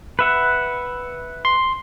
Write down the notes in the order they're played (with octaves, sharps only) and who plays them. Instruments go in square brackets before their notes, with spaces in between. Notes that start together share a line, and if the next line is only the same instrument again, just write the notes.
[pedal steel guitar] B4 E5 F#5
[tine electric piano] C6